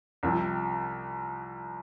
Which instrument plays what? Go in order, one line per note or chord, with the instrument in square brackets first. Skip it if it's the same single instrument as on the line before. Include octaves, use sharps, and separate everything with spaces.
[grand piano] C2 C3 F3